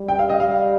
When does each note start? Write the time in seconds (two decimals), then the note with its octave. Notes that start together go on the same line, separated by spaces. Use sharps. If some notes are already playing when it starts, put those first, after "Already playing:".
Already playing: G3
0.08 G5
0.19 F5
0.29 D#5
0.40 G3 F5